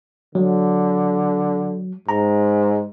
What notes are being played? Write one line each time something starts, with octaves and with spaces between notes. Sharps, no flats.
D3 F#3
G#2 A#5